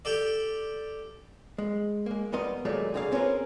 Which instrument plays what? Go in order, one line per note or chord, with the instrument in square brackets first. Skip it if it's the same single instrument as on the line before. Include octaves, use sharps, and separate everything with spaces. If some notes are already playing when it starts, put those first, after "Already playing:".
[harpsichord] G4 A4 D5
[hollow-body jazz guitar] G#3
G#3 A#3
F2 G3 B3 A#4 D#5 C6
D#2 A#2 F#3 G#3 A3
C#2 D3 G#4 A#4 F5
C4 C#4 F4 G#4 A#4 B4